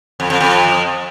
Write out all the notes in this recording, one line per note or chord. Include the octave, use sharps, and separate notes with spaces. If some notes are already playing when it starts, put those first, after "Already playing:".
F2
F2
F2